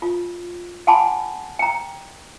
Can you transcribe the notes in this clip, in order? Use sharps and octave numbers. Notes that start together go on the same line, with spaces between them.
F4
F#5 G#5 A5 B5 C6 D6
G5 A#5